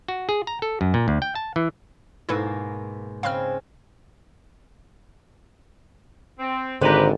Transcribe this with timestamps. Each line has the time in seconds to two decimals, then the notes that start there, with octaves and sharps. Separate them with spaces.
0.08 F#4
0.29 G#4
0.47 A#5
0.62 A4
0.81 F#2
0.94 A#2
1.08 D2
1.22 G5
1.35 A5
1.56 E3
2.29 G#2 B2 A#3 E4 A4 B4
3.23 C#3 G#3 C4 F5 B5 F6
6.39 C4
6.81 G#1 D3 G4 B4 C5 A#5